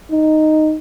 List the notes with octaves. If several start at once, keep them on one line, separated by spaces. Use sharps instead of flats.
D#4